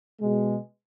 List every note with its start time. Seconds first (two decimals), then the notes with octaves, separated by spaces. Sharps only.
0.20 B2 G#3